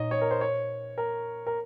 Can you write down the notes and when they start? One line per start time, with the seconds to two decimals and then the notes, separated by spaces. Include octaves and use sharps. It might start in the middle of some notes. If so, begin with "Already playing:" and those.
Already playing: A#2 D#4 C#5 D#5
0.11 C#5
0.21 A#4
0.31 C5
0.41 C#5
0.98 A#4
1.47 A#4